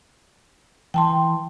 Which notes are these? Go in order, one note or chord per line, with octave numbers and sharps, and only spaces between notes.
E3 G5 A5 C6